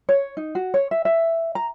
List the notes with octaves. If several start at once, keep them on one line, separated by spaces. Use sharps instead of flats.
C#5
D#4
F#4
C#5
E5
E5
A#5